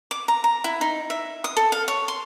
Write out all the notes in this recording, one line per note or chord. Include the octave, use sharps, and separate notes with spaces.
D6
A#5
A#5
E4
D#4
E5
D#6
A4
F5
C#5
C6